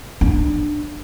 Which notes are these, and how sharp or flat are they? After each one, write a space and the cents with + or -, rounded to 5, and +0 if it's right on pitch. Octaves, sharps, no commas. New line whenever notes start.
D4 +20